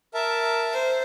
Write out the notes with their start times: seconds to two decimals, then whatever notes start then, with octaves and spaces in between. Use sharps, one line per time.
0.14 A#4 E5 A5
0.73 C5